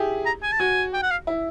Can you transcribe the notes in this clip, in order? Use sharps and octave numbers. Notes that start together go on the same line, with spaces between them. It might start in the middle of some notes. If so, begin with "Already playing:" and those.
Already playing: E4 G4 G#4
A#5
G#5
A5
F#4 G#5
G5
F#5
F5
E4